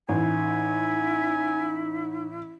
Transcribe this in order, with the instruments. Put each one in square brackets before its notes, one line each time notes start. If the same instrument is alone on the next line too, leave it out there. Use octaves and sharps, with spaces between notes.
[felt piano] A1 [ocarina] D#4 [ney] E4 [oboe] G#5